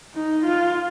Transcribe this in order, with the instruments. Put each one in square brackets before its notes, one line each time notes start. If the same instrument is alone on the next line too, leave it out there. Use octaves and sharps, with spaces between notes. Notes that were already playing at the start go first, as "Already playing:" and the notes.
[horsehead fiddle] D#4
F4